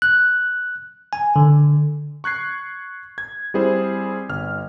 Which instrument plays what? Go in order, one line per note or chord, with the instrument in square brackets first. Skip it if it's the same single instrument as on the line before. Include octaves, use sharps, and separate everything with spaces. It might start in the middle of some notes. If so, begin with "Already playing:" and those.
[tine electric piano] F#6
G#5
D3
[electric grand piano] C#6 F#6 G#6 C7
G#6
G3 C4 E4 G#4 C5
G1 F6